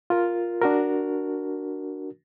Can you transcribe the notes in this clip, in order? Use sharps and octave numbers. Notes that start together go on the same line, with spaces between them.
F4 A#4
D4 F#4 A#4